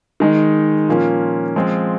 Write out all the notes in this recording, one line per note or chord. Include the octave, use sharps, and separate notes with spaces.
D#3 G#3 D#4
A#2 F3 A#3 C#4
F3 G#3 C4 F4